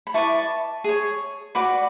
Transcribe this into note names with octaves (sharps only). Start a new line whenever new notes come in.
B5
E4 B4 D5 A5 C#6
G#4 C#5
F#4 B4 D5 B5 D6